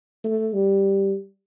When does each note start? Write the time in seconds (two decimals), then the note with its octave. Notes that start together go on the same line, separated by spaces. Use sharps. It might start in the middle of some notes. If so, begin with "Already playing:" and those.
0.24 A3
0.53 G3